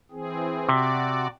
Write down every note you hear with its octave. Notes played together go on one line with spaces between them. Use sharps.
E3 C4 G#4
C3 F#4 D5